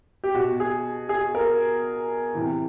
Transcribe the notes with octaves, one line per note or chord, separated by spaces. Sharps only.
G4
B2 F#4
G#4
G#4
A#4
C3 E3